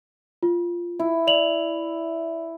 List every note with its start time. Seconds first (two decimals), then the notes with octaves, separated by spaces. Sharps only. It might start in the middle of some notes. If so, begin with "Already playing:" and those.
0.43 F4
0.99 E4
1.27 D5 F7 F#7